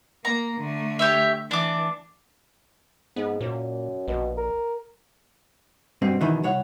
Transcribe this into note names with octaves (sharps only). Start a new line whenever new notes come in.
A#3 A#5
D3 A3
G4 C#5 E5
E3 D4 D6
G#2 B3
F#2 A#2
A#1 B2
A#4
G2 B2 C4
F#2 B2 D#3 E3
C2 C#5 F#5